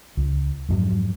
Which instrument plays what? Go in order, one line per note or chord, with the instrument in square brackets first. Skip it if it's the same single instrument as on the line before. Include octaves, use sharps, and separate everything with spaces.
[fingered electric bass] C#2
F2 G#2 F#3